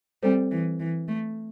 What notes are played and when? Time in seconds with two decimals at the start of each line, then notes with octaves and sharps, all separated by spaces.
0.23 G3 C4 A4 C5
0.51 E3
0.80 E3
1.08 A3